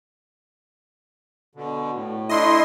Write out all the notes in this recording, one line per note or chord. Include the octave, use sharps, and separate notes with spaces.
B2 D3
A2
A3 D4 E4 D#5 C6